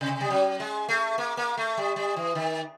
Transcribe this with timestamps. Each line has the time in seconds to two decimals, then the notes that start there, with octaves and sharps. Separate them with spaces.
0.01 C3
0.21 G3
0.30 F#3
0.60 G#3
0.89 A3
1.18 A#3
1.37 A#3
1.57 A3
1.77 G3
1.96 G3
2.16 E3
2.35 D#3